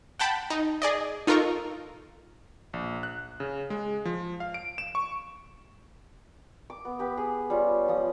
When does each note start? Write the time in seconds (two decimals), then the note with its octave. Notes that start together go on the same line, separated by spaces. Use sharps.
0.19 F#5 G5 A5 B5
0.50 D#4
0.82 G#4 D5 D#5
1.27 D#4 F4 A4 A#4 C#6
2.73 A#1
3.03 F#6
3.40 C#3
3.70 G#3
4.05 F3
4.40 F5
4.54 D7
4.78 E7
4.95 C#6
6.70 D6
6.85 B3
6.99 B3 G4 B4
7.17 G#4
7.50 G3 C#4 F4
7.88 F3 D#6